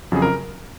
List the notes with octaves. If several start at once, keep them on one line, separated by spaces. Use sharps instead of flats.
F2 C#3 F#3 G#4
A#4